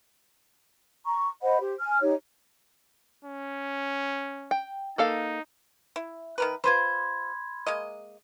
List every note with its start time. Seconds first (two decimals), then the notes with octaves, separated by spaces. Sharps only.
1.06 A#5 C#6
1.42 C5 D#5 F#5 B5
1.60 G4 C5
1.80 G#5 F6
2.01 D#4 G4 C#5
3.25 C#4
4.51 G5
4.98 A#3 D#4 A4 F5
5.96 E4
6.38 D#3 A#4 B4
6.64 F4 B4 C5 B5 C6 G#6
7.66 G#3 A#3 D#5